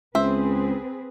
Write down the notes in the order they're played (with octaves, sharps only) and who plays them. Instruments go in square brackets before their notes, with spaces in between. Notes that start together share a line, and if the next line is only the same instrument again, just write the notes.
[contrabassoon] C#2 [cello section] C4 G#4 B4 [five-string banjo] C5 E5